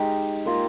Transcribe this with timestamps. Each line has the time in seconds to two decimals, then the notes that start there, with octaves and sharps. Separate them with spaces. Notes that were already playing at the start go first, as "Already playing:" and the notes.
Already playing: G#3 D#4 G4
0.46 A#3 F4 A#4